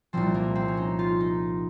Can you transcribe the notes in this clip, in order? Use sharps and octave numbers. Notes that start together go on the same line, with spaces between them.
C2 A#2 F3 C4
A#3
C4
C#4
D#4
F4
D#4